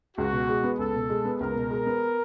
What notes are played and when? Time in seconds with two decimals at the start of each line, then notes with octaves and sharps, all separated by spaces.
0.17 C#2 F#4
0.33 B2
0.49 G#3
0.63 B3
0.79 C#2 A4
0.95 B2
1.10 G#3
1.25 B3
1.40 C#2 A#4
1.56 B2
1.71 G#3
1.86 B3